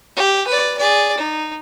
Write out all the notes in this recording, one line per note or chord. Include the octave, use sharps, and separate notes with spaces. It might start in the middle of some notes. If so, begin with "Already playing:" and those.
G4
B4 D5
G#4 D5
D#4